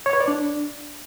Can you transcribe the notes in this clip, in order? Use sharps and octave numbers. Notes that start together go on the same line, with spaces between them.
C#5
B4
D5
D4